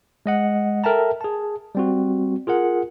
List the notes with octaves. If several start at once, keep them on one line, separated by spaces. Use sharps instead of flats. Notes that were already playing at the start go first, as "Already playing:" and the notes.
G#3 D#5 F#5
A4 A#4 E5 G5 A5 A#5
G#4 A5
G3 C4 F#4
F4 G#4 A#4 F#5